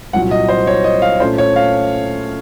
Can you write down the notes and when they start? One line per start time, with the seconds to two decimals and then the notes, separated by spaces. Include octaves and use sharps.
0.13 C2 A#2 F#3 F#5
0.31 D#5
0.49 C5
0.67 C#5
0.84 D#5
1.02 F5
1.20 A#2 A3 C#4 C5
1.38 C#5
1.56 F5